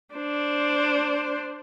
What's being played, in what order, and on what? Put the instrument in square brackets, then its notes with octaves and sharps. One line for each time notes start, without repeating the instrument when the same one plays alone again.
[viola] D4 C5